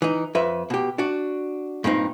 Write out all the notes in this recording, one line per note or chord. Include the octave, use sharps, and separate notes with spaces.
E3 D#4
F2 B4 E5
B2 G4
D4 F#4
G2 A#2 C4 D#4